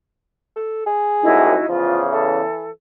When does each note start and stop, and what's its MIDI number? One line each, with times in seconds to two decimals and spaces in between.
0.56 0.83 69
0.86 1.59 68
1.23 1.54 36
1.23 1.54 42
1.23 1.54 45
1.23 1.66 63
1.23 1.66 64
1.23 1.66 66
1.69 2.41 40
1.69 2.41 49
1.69 2.06 53
1.69 2.02 65
2.11 2.67 52
2.11 2.71 69